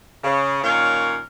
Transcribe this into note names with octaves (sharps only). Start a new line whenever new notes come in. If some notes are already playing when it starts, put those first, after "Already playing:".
C#3
A#2 D#3 C#4 A#4 C#5 F5